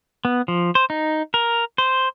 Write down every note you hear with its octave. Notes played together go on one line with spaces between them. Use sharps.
B3
F3
C5
D#4
A#4
C5